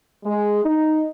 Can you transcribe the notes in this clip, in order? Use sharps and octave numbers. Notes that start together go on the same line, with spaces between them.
G#3
D#4